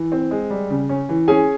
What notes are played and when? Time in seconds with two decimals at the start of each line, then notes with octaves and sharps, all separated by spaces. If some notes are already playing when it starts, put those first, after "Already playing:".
Already playing: E3
0.12 C4
0.31 G#3
0.50 G3
0.70 C#3
0.89 C#4
1.09 E3
1.28 C#4 G#4 G#5